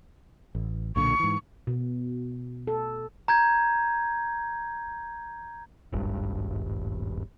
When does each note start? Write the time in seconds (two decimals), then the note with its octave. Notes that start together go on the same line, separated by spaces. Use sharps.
0.55 A1
0.96 B1 A#2 D3 C#6
1.19 G#2 E3
1.67 B2
2.67 A4
3.28 A#5 G6 G#6
5.93 D#1 G#1 G2